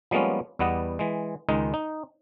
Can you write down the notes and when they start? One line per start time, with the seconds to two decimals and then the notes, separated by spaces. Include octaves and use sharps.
0.11 F3 G3 G#3 A#3 B3 C#4
0.59 E2 G3 B3 D#5 F#5
0.99 E3 G#3
1.49 C#2 D#3 G#3 D#4
1.74 D#4